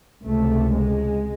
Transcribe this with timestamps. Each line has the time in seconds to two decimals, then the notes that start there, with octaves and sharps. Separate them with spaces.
0.22 C#2 C3 A3
0.74 G#3